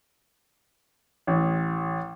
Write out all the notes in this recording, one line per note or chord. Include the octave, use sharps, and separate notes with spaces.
A1